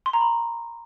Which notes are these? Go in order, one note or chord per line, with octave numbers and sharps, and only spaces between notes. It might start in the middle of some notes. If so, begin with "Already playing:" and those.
C6
A#5
B5